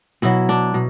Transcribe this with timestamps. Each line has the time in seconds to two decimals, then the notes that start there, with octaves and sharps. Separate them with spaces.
0.22 B2 F#3 E4
0.49 D4
0.74 B2